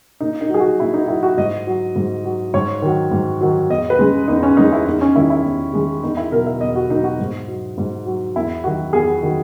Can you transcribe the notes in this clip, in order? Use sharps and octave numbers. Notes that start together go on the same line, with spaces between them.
A#2 D#4
D#4
F#3 G#4
F#4
A#2 E4
D#4
F#3 E4
F#4
G#2 D#5
F#3
G#2
F#3
G#2 C#5
D#3 F#3
G#2
D#3 F#3
E2 D#5
B4
C#3 G#3
E2 D#4
C#4
C#3 G#3 D#4
E4
E2 D#4
C#4
D#3 G#3 E4
E4
E2
D#3 G#3
E2 D#4
E4
B2 F#3 A#4
E5
E2 D#5
F#4
B2 F#3 D#4
F#4
G#2
F#3
G#2
F#3
E2 E4
D#3 F#3 F#4
E2 G#4
D#3 F#3